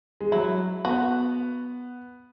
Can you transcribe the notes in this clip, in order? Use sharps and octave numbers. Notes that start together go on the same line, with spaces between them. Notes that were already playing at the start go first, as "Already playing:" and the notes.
G#3
F#3 E4
B3 F#4